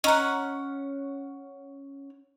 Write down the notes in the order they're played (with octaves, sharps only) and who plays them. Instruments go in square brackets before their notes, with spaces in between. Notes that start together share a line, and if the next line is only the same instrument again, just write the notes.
[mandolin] C#4 F#5 [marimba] D#5 A#5